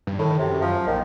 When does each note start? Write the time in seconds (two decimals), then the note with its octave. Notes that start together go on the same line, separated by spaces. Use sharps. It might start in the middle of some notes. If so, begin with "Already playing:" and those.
0.07 G2
0.19 A2 D#3
0.38 F#2 C3
0.61 F3
0.87 A#1 D#3